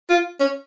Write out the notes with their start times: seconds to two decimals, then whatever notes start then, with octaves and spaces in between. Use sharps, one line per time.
0.10 F4
0.40 C#4